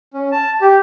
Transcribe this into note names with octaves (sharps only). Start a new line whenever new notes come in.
C#4
A5
G4